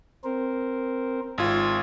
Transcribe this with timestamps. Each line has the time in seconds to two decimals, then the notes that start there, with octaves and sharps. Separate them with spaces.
0.24 C4 A#4 C5
1.38 G#1 F4 G#6